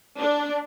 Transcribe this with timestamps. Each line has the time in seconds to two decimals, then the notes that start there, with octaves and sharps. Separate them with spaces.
0.18 D4